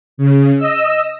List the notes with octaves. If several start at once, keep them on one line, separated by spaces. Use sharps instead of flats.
C#3
D#5 E6